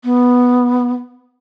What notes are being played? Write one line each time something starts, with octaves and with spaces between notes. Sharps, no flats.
B3